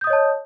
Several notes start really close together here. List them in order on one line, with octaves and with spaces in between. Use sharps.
G6 D#6 D#5 C#5 A5